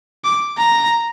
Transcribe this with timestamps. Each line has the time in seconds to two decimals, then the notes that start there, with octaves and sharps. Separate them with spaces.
0.24 D6
0.58 A#5